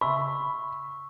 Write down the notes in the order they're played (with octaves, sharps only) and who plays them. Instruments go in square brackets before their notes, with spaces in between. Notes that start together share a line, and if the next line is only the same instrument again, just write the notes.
[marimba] C#3 E5 [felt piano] B5 [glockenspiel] C#6 E6